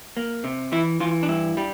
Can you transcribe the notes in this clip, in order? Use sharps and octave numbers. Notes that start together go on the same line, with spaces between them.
A#3
C3
E3 E4
E3 F4
D4
G2 E4
G3